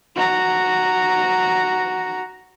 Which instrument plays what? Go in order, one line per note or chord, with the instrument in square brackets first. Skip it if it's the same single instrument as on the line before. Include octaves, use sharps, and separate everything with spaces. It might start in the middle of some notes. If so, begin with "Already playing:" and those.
[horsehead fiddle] F#4 A#5